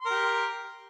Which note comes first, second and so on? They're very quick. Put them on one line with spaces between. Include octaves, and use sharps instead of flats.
C6 A#4 G4